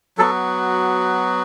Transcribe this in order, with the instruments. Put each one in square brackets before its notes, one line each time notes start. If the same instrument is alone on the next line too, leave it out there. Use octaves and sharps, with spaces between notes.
[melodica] F#3 B3 F#4 A4